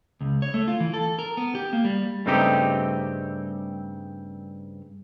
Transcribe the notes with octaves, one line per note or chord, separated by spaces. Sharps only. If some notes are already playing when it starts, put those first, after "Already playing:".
C#2
C#5
A3
F4
E3
A4
A#4
B3
G4
A#3
G3
G2 C#3 A3 C4 D#4 G4